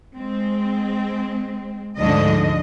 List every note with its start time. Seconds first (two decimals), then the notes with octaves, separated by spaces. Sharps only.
0.16 G#3 C4
1.99 D2 G#2 D3 F3 D4 D#5